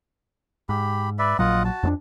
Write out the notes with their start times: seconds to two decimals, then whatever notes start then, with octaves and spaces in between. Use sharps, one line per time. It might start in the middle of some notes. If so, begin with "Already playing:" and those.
0.69 G#2 G4 B5
1.19 B4 D5 E5
1.39 A#1 A#2 F#3 F4 D#5 F#5
1.65 F#4 A5
1.83 F2 G#3 D4